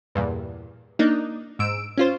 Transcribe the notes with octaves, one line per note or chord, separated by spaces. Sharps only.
E2 G2 A#2
A#3 D4 D#4
G#2 E6 D7
C#4 F4 C5